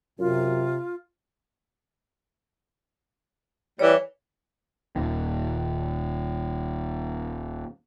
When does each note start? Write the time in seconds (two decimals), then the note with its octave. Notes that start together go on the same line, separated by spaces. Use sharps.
0.19 F#2 C3 F4
3.79 E3 G3 C#5
4.96 D#1 D#2 D#3